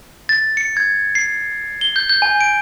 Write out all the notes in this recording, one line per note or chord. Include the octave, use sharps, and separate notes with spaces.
A6
C#7
G#6
C7
G7
G6
G6
G#5
D7